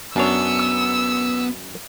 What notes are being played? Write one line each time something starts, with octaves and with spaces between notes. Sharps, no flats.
F#2 B3 D4 C#5 E6